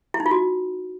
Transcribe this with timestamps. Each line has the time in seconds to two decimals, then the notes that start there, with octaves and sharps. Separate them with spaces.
0.14 E4
0.20 D#4
0.26 F4
0.31 F#4